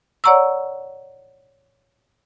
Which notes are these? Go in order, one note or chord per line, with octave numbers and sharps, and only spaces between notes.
C#5 D5 F#5 A#5 C#6 E6